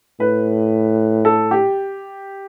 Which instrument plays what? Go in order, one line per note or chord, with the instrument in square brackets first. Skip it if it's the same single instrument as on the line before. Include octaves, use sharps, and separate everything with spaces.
[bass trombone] A2 [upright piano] B4
[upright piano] A4
G4